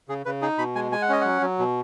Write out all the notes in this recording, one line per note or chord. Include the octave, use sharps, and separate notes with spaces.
C#3 G#4
C#3 B4
D#4 G#4
B2 B5
G#3 G#5
G#3 G#5
F#5
C#4 D#5
F#3 F#5
F#3
B2